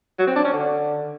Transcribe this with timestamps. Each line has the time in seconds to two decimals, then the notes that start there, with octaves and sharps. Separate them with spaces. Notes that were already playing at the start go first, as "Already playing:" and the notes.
0.19 F#3
0.27 C4
0.36 D4
0.45 C#4
0.53 D3